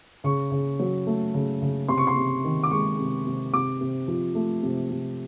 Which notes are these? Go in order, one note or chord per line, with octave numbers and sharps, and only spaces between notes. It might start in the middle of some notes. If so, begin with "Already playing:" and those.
C#3 C#6
C#3
F#3
A3
C#3
C#3
C3 C6
C#6
C6
C3
D#3
D6
G#3 C#6
C3
C3
C3 D6
C3
F3
A3
C3
C3